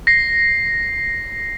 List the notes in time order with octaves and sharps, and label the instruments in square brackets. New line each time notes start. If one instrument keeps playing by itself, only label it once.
[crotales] A#6 C7